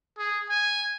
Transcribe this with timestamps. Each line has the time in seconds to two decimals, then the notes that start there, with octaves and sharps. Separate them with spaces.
0.18 G#4
0.50 G#5